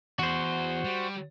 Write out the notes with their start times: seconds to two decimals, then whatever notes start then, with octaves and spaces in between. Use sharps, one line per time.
0.19 E2 F#4 C5
0.84 G3